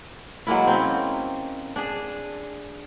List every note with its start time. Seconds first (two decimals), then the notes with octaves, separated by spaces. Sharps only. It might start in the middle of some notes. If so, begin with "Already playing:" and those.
0.47 F#3 G#3 A#3 E4
0.67 C4 C#4
1.76 D4 G#4